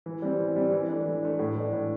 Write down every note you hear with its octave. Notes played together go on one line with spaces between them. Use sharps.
E3
G3 C4
E3
G3 C4
E3
A3 D4
E3
A3 D4
A2
E3 A3 D4
A2